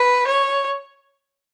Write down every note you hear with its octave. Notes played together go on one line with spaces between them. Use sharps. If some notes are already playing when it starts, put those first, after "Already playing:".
Already playing: B4
C#5